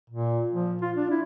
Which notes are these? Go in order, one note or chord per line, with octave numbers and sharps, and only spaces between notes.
A#2
F3
F4
D4
E4